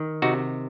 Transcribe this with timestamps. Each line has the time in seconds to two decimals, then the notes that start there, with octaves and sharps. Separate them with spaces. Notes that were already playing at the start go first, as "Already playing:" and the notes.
Already playing: D#3
0.22 C3 D#4 F#4